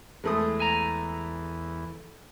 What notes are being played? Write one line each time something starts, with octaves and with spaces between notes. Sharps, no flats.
E2 G#3 A3 D#6
G#5 A#5